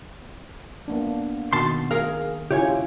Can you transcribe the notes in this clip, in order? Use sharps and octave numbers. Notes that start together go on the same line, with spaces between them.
A#3 B3 D4
B2 D#3 A5 C6
G#4 A#4 F5
C#3 E4 F4 G4 C#5 G#5